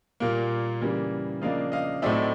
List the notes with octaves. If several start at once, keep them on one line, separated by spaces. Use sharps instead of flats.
A#2 G3 A#3
C#3 E3 G3 A#3
C#3 F3 A#3 D4 D#5 F5
D#5 F5
A2 F#3 A3 C4 D#4 D5 E5